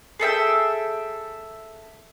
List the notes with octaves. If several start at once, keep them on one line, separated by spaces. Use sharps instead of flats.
G#4 A4 E5 G5